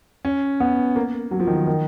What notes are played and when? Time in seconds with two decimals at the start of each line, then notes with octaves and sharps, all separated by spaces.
0.25 C#4
0.60 B3
0.96 A#3
1.31 F#3
1.40 F3
1.47 D#3
1.55 F3
1.67 D#3